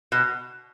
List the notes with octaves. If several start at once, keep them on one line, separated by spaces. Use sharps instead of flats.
B2